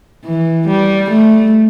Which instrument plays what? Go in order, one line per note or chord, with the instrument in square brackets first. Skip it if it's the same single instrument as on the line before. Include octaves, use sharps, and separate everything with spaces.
[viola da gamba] E3
G3
A3